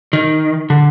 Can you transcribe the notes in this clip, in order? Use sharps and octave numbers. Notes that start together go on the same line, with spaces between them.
D#3
D3